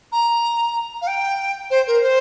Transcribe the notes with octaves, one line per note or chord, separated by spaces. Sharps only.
A#5
F5
G5
C5
A#4
C5